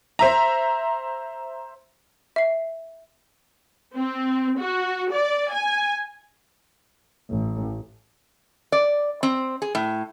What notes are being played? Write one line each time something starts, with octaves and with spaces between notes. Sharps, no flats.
C5 E5 A#5
E5 C7
C4
F#4
D5
G#5
A1
D5
C4
G#4
A2